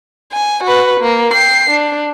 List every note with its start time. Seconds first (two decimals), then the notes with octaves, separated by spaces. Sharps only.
0.32 G#5
0.64 F#4 B4
1.00 A#3
1.34 G5 C7
1.70 D4